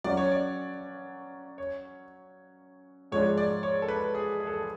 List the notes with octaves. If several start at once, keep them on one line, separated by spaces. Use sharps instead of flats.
F#3 C#4 F#4 D5
C#5
D5
C#5
G#2 F3 G#3 D4 C#5
D5
C#5
A4
B4
G#4
G#4
A4
G#4